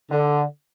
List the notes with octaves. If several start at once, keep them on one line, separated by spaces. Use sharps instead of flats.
D3